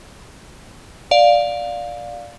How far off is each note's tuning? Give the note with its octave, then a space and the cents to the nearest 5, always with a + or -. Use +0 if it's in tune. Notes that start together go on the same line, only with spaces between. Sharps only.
D5 +0 F5 +15